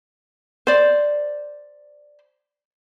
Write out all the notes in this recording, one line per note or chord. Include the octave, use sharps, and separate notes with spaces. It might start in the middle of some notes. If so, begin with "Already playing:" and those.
C5 D5